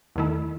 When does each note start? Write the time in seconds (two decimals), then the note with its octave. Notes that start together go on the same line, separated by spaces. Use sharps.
0.16 E2 D#3 A3 E4